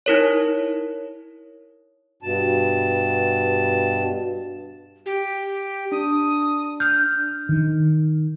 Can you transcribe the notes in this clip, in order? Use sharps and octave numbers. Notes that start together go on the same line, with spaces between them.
D#4 E4 A#4 C#5
G2 B2 A5
G4
D4 D#6
F6 G6
D#3